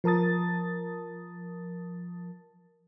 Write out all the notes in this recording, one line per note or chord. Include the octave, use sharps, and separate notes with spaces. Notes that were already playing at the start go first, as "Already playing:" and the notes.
F3 A#4 A5 D#6 A6